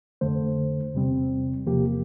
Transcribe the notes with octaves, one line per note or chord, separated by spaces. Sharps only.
F2 D3 A3 C5
E2 C3 G3 C4
E2 C3 F3 A#3 G4